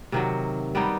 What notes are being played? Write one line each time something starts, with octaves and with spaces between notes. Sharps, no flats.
C3 D#3 F#3
G3 B3 D#4 G4